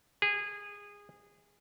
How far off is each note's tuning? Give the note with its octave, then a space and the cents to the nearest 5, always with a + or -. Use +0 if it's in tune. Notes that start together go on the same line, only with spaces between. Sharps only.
G#4 -20